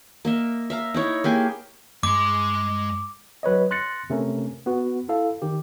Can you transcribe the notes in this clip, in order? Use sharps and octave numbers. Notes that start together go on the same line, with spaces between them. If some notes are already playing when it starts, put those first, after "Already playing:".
A#3 D#5 E5
E5 F5 A#5
D#4 E4 C#5
A#3 G4 G#4 G#5
G2 G#3 C6 D6
F#3 B4 C#5 D#5
C6 F#6 A6 A#6 C#7
C3 A3 C#4 A#4
B3 F#4
E4 A4 F5
D#3 G4